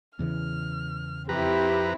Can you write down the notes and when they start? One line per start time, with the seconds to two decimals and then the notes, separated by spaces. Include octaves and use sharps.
0.19 E2 C#3 E3 F6
1.29 F2 C4 E4 G4 B4 A#5